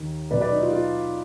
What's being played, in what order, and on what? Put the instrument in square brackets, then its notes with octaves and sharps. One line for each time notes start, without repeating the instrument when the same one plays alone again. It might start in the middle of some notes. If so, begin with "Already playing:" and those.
Already playing: [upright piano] D#2 D#3
B1 B2 B4 D5
B4 D5
D#4
F4
F4